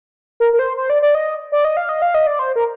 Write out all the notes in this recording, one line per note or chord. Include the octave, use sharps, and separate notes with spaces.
A#4
A#4
C5
C5
D5
D5
D#5
D5
D#5
F5
D#5
F5
D#5
D5
C5
A#4